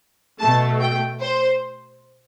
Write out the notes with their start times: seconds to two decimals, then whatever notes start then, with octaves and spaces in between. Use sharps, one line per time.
0.40 B2 A3 A5
0.81 G5
1.21 C5